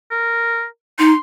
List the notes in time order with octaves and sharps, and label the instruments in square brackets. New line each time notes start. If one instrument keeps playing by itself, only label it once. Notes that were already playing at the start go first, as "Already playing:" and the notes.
[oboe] A#4
[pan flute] D#4 [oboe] C6